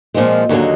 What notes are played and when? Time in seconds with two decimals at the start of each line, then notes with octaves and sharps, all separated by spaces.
0.14 A#2 F3 G#3 C4
0.49 D#2 D3 F#3 A#3 D#4